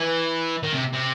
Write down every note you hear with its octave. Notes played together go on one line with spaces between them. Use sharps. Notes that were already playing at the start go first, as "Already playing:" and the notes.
Already playing: E3
D#3
C3
C3